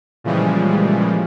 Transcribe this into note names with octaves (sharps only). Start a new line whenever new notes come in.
A#2 C#3 E3 F3 G3 G#3